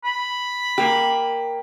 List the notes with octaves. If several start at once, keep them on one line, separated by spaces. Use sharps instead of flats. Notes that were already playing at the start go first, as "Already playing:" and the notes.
B5
A#3 G4